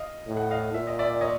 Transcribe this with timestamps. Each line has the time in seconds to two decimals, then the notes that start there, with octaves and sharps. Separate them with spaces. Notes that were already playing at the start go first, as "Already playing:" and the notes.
Already playing: D#5 F5
0.28 A2
0.37 F#5
0.51 D#5 F5
0.74 A#2 E5
0.87 D#5
0.99 D5 E5
1.21 C#5 D#5